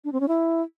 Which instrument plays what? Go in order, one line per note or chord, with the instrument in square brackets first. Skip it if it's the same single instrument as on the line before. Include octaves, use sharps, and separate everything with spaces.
[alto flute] D4
C4
C#4
E4